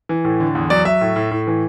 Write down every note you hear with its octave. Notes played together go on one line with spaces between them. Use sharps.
E3
A2
D3
E2
F#3 D5
F#3 E5
A2
A2
A2
E3